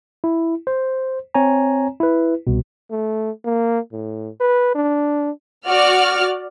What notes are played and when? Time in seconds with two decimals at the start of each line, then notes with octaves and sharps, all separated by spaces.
0.24 E4
0.67 C5
1.34 C4 C#5 G#5 A#5
2.00 E4 B4
2.47 C2 B2
2.91 A3
3.45 A#3
3.92 A2
4.40 B4
4.75 D4
5.67 F#4 D5 F6